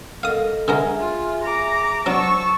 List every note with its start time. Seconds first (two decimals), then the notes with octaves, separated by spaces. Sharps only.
0.23 A4 A#4 D#5 F5 D#6
0.68 D3 G#3 G#4 A#4 E5 G#5
0.99 F4
1.41 A#5 D6
2.06 F#3 D4 C5 A5 C#6 E6